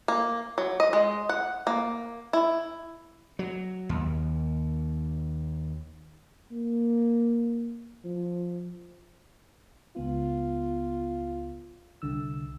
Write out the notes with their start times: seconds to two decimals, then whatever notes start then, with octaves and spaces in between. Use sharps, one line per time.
0.08 A#3
0.58 F#3
0.80 D#5
0.93 G#3
1.29 F#5
1.67 A#3
2.33 E4
3.39 F#3
3.89 D#2
6.52 A#3
8.04 F3
9.96 C#2 B3 F4
12.02 C2 D3 E6